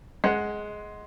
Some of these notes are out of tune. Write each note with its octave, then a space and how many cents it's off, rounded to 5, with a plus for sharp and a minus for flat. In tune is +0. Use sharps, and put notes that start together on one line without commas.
G#3 +10 F#5 +0